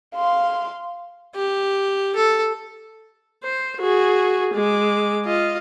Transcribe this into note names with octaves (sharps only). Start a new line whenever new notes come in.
F5 C6
G4
A4
C5
F#4 G#4
G#3 D6
F4 D#5